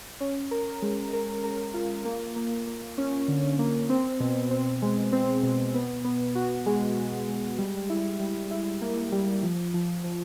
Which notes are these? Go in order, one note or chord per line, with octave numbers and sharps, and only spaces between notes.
C#4
A#4
G#3
A#4
A#4
F4
A#3
A#3
A#3
C#4
D3
A#3
C4
B2
C4
G#3
C4
B2
B3
B3
F#4
G#3
G#3
G#3
G3
E4
G3
E4
A#3
G3
F3
F3
F3